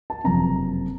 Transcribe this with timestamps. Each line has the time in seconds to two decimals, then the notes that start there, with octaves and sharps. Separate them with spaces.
0.10 A5
0.24 F#1 F2 C3 A#5